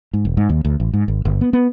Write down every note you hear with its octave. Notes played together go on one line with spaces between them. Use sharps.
G#2
E1
G#2
D#2
D2
A1
G#2
G#1
G1
B3
B3